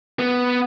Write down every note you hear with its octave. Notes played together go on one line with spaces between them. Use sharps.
B3